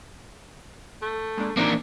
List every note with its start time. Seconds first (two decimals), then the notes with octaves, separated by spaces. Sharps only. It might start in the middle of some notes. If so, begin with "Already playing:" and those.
1.02 A3
1.37 G#3 A#3 D4
1.57 C3 E3 A#3 C4 D4 D#4